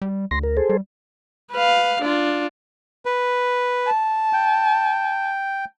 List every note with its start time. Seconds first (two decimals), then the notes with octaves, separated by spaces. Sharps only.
0.02 G3
0.31 D2 C6 A#6
0.43 A#4
0.57 G#4 A4 C5
0.69 G3
1.52 B4 F5
2.02 D4 F4
3.05 B4
3.87 A5
4.33 G5